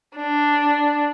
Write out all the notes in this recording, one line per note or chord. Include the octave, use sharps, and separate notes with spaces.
D4